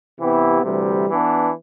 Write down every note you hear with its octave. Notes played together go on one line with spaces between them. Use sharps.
C3 E3 B3 E4 G4
D2 C3 E3 G3
E3 B3 D4